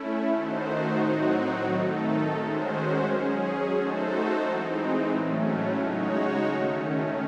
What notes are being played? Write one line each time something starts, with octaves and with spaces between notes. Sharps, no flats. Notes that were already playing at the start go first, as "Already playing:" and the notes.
Already playing: A3 C#4 E4
D#3 A3 D#4 F#4 C5
A2 F#3 C4 D#4 F#4
D#3 A3 D#4 A4
D#3 G#3 C#4 F#4 C5
F#3 C#4 G#4
A3 D#4 F#4 A4 C5
E3 G#3 C4 D#4
A2 F#3 A3 C#4
C#3 G#3 D#4 F#4 C#5
D#3 A3 C#4